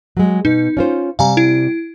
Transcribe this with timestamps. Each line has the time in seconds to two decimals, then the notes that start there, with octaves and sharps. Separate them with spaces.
0.17 F#3 G#3
0.45 B2 D#4
0.77 C#4 F4 C5
1.19 C3 G3 F5 G#5 A#5
1.37 E4